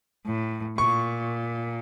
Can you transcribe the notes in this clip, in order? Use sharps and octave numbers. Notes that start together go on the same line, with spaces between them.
A2
A#2 C#6